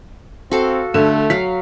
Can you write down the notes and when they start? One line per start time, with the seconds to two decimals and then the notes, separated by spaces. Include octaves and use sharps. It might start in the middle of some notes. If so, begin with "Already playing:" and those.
0.51 C4 F#4 A4 F5
0.94 D3 A3
1.30 F#3 F5 B6